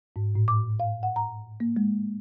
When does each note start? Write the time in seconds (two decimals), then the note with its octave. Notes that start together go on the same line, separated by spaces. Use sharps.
0.16 G#2
0.35 A2
0.48 D6
0.80 F5
1.03 F#5
1.16 A#5
1.60 A#3
1.76 G#3